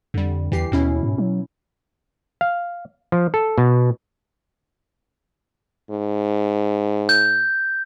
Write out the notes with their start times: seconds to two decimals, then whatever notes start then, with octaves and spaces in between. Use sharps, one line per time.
0.14 F2 D3 G3
0.52 E2 E3 G4 C7
0.72 D#2 B2 C#4 E4
1.03 G#2
1.18 F#3
2.41 F5
3.12 F3
3.34 A4
3.58 B2
5.90 G#2
7.09 G6